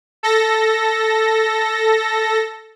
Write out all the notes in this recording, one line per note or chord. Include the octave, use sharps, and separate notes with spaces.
A4 A#6